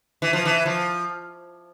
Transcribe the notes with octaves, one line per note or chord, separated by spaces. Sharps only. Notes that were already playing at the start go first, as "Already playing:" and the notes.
E3
F3
E3
F3